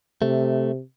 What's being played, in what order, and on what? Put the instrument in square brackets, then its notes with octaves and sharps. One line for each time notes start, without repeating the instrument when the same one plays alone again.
[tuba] C3 [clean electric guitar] A3